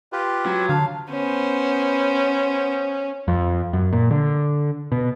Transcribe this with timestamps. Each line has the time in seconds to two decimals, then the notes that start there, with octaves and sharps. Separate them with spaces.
0.12 F4 G4 B4
0.46 F#3
0.69 D3 F5 A5
1.10 B3 C#4 C5
3.28 F2
3.73 F#2
3.93 A#2
4.11 D3
4.92 B2